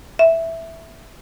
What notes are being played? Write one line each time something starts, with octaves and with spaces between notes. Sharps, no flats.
E5